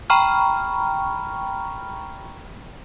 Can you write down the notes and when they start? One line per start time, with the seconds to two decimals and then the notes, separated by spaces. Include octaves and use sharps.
0.10 G5 A#5 B5 C#6 F6